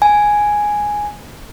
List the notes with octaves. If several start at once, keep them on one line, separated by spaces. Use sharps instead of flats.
G#5